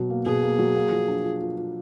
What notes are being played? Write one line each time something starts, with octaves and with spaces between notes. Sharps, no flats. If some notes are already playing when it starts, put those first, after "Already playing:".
Already playing: B2 F#3
A#3
B2 G#4
A#3
F#3
A#3
F3
D4
F4
F4
F4